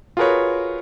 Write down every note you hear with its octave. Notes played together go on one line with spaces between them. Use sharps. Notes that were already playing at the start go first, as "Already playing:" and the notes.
F4 F#4 G#4 A#4 B4 C#5